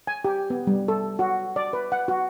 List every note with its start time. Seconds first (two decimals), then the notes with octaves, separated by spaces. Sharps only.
0.07 G#5
0.25 G4
0.50 B3
0.67 G3
0.88 A4
1.19 F#4
1.56 D5
1.73 B4
1.92 F#5
2.08 F#4